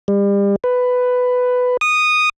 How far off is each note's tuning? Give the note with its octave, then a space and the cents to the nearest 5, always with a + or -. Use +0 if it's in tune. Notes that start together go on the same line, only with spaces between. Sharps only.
G3 +35
B4 +10
D#6 -10